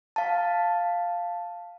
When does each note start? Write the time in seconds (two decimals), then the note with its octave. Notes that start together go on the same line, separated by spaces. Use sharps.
0.16 F5 A5